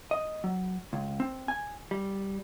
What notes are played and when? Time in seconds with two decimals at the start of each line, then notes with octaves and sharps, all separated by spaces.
0.11 D#5
0.44 F#3
0.93 C#2
1.20 C4
1.48 G#5
1.91 G3